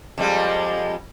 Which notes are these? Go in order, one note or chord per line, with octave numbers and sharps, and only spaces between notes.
F2 G3 G#3